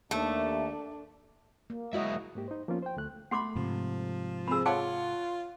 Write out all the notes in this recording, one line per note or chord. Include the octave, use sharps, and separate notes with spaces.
D#2 A3 D4 E5
A#3
F#3 G#3 E4 F#4 D#5 E5
G#2 A#3 G4
D#4 C5
F3 A#3 B3 C#4 F4
C5 G5
D2 A3 F#6
A3 F#5 B5 C6 D6
G#2 C3 F3
C4 G#4 B5 E6
F4 C#5 F5 F#5 A5 D6